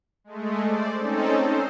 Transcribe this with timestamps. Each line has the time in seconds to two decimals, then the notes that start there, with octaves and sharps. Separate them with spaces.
0.24 G#3 A3
0.62 C5 D5
0.98 C4 C#4 D#4 A4
1.38 C5